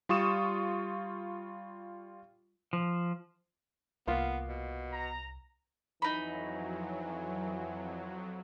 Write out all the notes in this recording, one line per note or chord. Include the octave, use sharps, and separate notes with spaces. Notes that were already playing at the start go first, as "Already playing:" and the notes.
G3 F4 C#6 D#6 E7
F3
C2 A#3 B3 F4
B2
A#5
F2 E3 F#3 D#4 B5